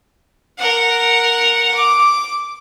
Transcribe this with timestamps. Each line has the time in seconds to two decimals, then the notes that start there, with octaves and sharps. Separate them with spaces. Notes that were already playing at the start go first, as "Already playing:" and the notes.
0.59 A#4 F#5
1.74 D6